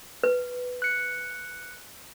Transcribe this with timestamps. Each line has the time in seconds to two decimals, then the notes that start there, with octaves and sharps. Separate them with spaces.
0.24 B4
0.82 F#6 C#7